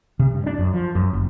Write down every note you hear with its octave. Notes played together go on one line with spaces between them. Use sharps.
C3
G2
D4
F#2
F3
F#2
F#1